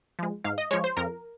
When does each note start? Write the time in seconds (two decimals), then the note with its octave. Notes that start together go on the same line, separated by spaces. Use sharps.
0.19 F3 G#3
0.44 G#2 F5
0.58 D#5
0.71 F3 G#3 C#5
0.84 C5
0.97 F2 A#4